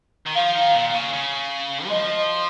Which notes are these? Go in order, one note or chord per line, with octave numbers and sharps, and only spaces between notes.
D#3
F3 F5
D#3
A#2
C#3
C#3
G#3
F3 D#5